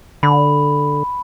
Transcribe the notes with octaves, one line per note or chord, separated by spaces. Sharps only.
D3 B5